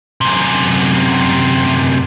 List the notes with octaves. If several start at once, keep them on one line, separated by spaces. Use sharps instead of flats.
F#2 C3